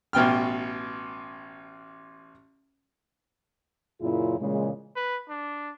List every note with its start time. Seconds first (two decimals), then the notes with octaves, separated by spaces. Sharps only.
0.13 A1 B2 G5 F6
4.02 F#2 A#2 C#3 E4 F4 G#4
4.40 A#2 C#3 E3 G#3
4.96 B4
5.29 D4